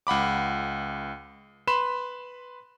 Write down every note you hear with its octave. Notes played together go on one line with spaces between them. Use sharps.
C#2 F#5 B5 D6
B4 B5 C6 E7